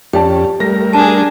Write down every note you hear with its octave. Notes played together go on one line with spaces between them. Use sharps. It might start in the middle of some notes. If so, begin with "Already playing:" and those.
F2 C#4 G4 D5 G5 A5
G3 A3 A#4 A#6
D4 G#4 A5